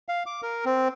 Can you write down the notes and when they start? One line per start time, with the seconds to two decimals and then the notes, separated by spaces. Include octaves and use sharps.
0.09 F5
0.26 D6
0.43 A#4
0.65 C4